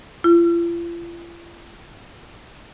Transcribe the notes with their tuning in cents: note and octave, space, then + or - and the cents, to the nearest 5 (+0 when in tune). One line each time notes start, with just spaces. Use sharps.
F4 -45